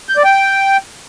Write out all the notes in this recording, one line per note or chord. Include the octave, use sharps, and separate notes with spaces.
G6
D5
G5